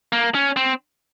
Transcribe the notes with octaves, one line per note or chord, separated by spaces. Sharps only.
A#3
C#4
C4